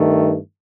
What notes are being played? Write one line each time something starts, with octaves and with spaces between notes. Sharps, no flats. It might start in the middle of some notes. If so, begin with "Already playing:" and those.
Already playing: G2 D#3 A3